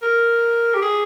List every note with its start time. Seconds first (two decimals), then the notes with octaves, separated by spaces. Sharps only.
0.02 A#4
0.75 G4
0.82 G#4